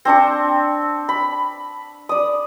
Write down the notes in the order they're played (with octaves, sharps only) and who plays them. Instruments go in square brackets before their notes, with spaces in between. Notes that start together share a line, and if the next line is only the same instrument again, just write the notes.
[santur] C4 D4 A5 C#6
B5
D5 D#6